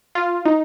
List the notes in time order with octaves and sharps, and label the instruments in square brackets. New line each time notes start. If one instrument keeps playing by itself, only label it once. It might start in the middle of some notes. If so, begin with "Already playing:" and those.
[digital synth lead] F4
D#4